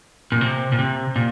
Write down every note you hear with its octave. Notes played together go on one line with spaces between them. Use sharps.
A#2
C3
A#2
C3
A#2